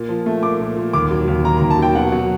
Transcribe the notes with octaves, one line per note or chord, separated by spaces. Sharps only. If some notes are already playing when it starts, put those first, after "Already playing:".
Already playing: A#2
F3
A3
A#2 D6
A#2
A#2
D#2 D6
F#3
D#2
D#3 A#5
A#5
D#2
A5
F#3 G5
B2 F#5
F#3